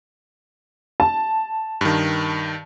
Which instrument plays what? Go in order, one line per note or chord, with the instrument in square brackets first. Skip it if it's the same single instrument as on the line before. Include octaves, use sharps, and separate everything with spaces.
[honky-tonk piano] A5
[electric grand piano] G2 D#3